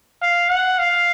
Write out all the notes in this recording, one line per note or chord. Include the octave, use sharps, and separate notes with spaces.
F5
F#5
F5